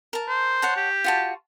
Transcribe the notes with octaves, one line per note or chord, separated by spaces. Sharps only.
A#4 A5
C5
C#5 F#5 A5
G4
F4 F#4 A5